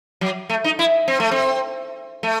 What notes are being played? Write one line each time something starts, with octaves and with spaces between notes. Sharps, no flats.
F#3
A3
D#4
E4
C4
A3
C4
A3